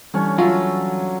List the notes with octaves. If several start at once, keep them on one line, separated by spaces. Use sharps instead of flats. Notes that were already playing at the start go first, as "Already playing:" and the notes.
D3 E3 G3 C#4 C#5
F#3 F4 E5